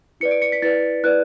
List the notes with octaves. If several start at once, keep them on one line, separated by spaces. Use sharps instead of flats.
E4 B4 D5 C#7
D7
C#7
B6
E4 B4 D5 A6
E4 B4 D5 F#6